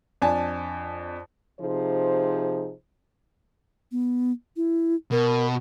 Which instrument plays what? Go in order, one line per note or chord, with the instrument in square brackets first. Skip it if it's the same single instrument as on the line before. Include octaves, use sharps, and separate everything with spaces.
[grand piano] F2 D4 G#5 A5
[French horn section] C3 F3 D#4 G#4 C5
[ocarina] B3
E4
[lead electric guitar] B2 [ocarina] A#4